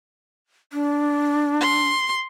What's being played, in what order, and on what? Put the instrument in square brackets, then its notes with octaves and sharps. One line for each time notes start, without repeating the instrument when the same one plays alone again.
[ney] D4
[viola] C6